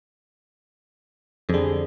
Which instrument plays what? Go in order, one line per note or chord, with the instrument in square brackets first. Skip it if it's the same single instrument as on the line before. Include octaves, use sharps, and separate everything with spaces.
[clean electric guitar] F2 D3 [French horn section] G3 G#4